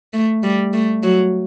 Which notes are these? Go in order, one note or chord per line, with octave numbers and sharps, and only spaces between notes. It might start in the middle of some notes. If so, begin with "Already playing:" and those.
A3
G3
A3
F#3